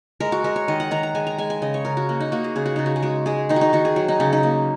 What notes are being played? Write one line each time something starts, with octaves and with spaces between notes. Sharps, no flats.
G#3 A#4
F#4
G#3 A#4
C#5
D#3 D#5
F#5
D#3 A#5
A#5
G#3 G#5
A#5
G#3 G#5
G#5
C#3 D#5
C#5
C#3 A#4
F#4
A#3
D#4
A#3 F#4
G#4
C#3 G#4
F#4
C#3 D#4
F#4
G#4
G#3 F#4
G#3 G#4
D#3 D#4
F#4
D#4
D#3 F#4
G#4
F#3
D#4
C#3 C#4
D#4
A#3